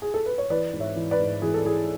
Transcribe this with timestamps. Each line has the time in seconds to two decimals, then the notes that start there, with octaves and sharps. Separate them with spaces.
0.02 G#4
0.14 A4
0.26 B4
0.38 C#5
0.50 E3 B4 D5
0.73 G#2
0.80 C#5 E5
0.96 E3
1.11 B4 D5
1.19 G#2
1.42 E3 G#4
1.54 A4
1.65 E3 G#4